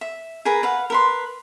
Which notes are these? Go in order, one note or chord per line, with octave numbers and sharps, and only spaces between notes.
E5
G#4 A#4 B4 A#5
B4 F5 F#5
A#4 B4 C6